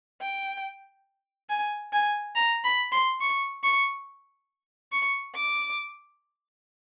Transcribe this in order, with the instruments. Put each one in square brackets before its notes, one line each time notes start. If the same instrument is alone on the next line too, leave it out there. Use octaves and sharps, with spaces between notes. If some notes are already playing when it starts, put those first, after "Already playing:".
[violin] G5
G#5
G#5
A#5
B5
C6
C#6
C#6
C#6
D6